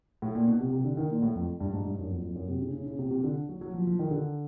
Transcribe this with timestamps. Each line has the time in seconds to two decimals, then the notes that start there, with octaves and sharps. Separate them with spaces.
0.22 A2
0.35 A#2
0.48 B2
0.60 C3
0.73 C3
0.85 D3
0.97 D#3
1.11 A#2
1.22 A2
1.35 F2
1.60 G2
1.73 G#2
1.85 G2
1.99 F#2
2.11 F2
2.23 F2
2.35 F#2
2.48 C3
2.61 C#3
2.73 C#3
2.86 C#3
2.99 C3
3.11 C3
3.24 D3
3.49 F#3
3.61 F#3
3.74 F3
3.87 F3
3.99 D#3
4.11 D3